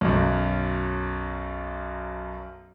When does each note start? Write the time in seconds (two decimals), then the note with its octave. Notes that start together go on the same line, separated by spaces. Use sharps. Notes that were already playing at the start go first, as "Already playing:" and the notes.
0.01 B1 F#2